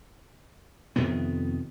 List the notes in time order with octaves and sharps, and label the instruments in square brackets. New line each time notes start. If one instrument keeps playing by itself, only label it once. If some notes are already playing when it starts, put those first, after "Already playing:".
[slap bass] F2 C3 D#3 B3